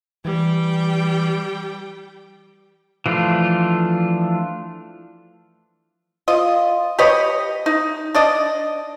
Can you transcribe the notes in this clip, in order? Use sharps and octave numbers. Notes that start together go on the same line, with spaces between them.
E3 G3 G5
E3 F3 A3 D4 F4
F4 D#5
G4 B4 C#5 D#5
D#4
D4 D5 D#5